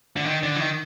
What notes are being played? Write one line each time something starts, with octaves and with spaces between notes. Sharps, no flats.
D3
D#3
D3
E3
D#3